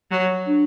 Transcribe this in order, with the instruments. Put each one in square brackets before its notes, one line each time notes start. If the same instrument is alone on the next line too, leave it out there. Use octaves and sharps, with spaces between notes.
[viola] F#3
[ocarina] D4